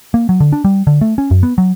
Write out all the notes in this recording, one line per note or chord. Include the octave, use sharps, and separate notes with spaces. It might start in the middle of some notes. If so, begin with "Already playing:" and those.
A#3
F#3
D3
D4
G3
D3
A3
C#4
F#2
B3
F#3